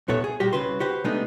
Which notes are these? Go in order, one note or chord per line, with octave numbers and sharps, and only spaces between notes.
C2 A#2 B3 A4 C#5 E5
G#4
A#2 G3 F#4 G4
C2 C#3 F#4 B4 C6
F#4 G4 B4 C5
C3 G#3 A3 B3 D4 D#4